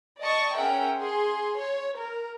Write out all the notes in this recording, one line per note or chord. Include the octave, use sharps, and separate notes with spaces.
D5 D#5 A5 C#6
C#4 G#4 A#4 E5 F#5 G5
G#4 C6
C#5
A#4